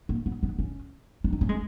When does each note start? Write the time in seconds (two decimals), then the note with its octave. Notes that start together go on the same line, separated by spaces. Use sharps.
0.09 A#3
0.26 B3
0.43 B3
0.59 C#4
1.24 D4
1.33 D#4
1.41 C#4
1.49 G#3